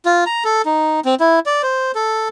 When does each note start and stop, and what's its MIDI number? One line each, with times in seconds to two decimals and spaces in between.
0.05 0.24 65
0.26 0.44 82
0.44 0.62 69
0.65 1.00 63
1.05 1.15 60
1.20 1.39 64
1.46 1.62 74
1.63 1.92 72
1.95 2.29 69